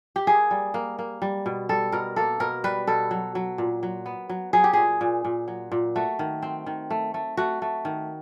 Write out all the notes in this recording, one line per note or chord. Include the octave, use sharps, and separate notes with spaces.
G4
A#3 G#4
G3
A#3
A#3
G3
B2
G3 A4
B2 A#4
A#3 A4
B2 A#4
G3 B4
B2 A4
F#3
F#3
A#2
F#3
B3
F#3
F#3 G#4
G4
A#2 G#4
A#2
A#2
F#3
A#2
A3 F#4
D#3
C4
D#3
A3
A3
A3 F#4
A3
D#3